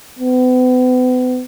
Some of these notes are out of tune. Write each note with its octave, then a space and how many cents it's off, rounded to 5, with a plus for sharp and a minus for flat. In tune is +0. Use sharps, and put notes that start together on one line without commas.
B3 +40